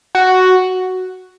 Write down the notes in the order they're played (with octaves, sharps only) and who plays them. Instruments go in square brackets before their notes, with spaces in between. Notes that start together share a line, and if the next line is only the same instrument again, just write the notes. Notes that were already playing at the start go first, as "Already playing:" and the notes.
[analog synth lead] F#4